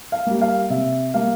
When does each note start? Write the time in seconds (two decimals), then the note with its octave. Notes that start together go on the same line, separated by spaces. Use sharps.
0.12 F5
0.26 G3 A#3
0.41 F5
0.70 C3 E5
1.13 G3 A#3 F5